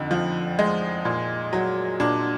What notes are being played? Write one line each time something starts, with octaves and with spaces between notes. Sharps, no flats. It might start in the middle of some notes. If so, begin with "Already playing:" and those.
Already playing: F2 D3 D#4
F3
G#3
A#2
F#3
A#2 D4